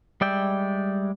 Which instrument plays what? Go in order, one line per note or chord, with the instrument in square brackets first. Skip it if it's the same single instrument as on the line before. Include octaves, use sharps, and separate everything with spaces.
[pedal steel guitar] G3 G#3 D5 E5 G5